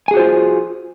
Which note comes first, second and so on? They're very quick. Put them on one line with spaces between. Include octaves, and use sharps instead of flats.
G#5 G#4 F#4 C5 F4